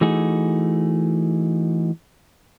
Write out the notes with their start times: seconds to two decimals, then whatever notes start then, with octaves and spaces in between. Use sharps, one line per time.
0.01 E3 A3 D#4 F#4 G#4